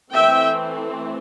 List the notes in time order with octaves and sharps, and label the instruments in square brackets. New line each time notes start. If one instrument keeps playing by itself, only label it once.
[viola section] E3 A3 C4 E5 G5